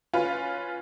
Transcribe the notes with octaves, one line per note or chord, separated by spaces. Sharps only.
C#4 F4 B4